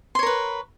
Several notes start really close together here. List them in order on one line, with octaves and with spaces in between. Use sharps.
C6 C#5 A#4 B4